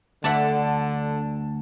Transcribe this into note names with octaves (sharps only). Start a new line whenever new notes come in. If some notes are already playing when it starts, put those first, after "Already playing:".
D2 D3 D5 E5 F#5 A5